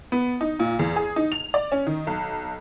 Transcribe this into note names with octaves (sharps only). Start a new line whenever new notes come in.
B3
D#4
A#2
E2
G#4
D#4
F7
D5
C#4
D#3
B1